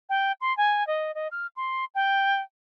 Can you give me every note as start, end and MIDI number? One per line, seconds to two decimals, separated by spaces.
0.09 0.32 79
0.41 0.55 84
0.57 0.86 80
0.87 1.11 75
1.15 1.28 75
1.31 1.47 89
1.56 1.85 84
1.95 2.41 79